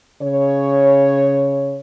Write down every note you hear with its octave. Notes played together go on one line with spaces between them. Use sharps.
C#3 C#5